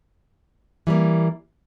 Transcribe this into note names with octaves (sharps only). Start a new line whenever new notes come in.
E3 G3 A#3